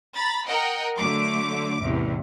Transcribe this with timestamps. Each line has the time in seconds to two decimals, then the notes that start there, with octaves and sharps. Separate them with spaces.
0.15 A#5 B5 A6
0.47 A#4 D#5 F#5 G5
0.97 D3 F#3 A3 D6
1.81 A1 E2 C3